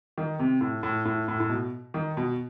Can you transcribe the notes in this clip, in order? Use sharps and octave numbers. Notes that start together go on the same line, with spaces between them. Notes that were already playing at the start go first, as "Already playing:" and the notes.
D#3
C3
A2
A2
A2
A2
A2
B2
D#3
B2